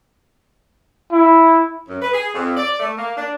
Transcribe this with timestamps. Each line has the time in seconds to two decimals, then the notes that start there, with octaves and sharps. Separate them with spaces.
1.12 E4
1.88 F#2
2.01 B4
2.13 G#4
2.34 F2
2.57 D5
2.80 A3
2.97 A#3
3.16 D4